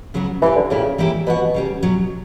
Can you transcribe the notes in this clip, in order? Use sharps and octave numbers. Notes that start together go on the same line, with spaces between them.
C#3 F#3 B3 F#4
A#2 E3 G3 C#4 G4
D3
A#2 C#3 A#3 E4 G4
E3 G3 A#3 E4 G4
B2 E3 B3 F#4
C#3 G3 C#4
B2 F#3 C#4